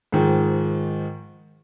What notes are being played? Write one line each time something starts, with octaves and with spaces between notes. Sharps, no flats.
G#2 D#3 F3